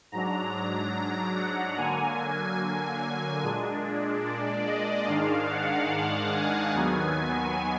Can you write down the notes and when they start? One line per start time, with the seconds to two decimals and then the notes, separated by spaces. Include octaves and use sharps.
0.12 G#2 F#3 D4 A#5
1.36 F#5
1.77 D3 F#3 A#3 G#5
2.60 G#5
3.43 A#2 G#3 D4
4.25 D5
4.67 D#5
5.08 G#2 D#3 G#3 D4 F5
5.50 F#5
5.90 F5
6.32 G#5
6.73 D#2 D#3 F#3 B3